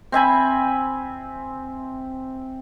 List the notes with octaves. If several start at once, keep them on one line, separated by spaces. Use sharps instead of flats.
C4 E5 G#5 B5